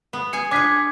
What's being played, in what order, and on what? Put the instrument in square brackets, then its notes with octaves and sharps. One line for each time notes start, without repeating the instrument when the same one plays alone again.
[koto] B3
[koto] G#4 G#5 [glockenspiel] C#7
[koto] D4 F4 G#4 [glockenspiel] D6 G#6 B6